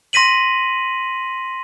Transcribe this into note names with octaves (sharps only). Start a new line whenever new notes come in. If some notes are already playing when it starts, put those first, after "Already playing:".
C6 A#6 B6 D#7 F#7